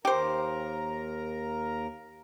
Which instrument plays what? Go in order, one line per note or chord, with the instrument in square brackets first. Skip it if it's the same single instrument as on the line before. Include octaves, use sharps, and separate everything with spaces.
[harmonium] D#2 A#4 A#5 [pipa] G4 C5